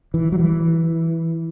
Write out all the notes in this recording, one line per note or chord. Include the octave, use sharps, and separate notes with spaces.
E3
F#3
E3